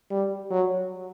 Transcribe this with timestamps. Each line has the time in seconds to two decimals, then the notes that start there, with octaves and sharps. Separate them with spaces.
0.10 G3
0.51 F#3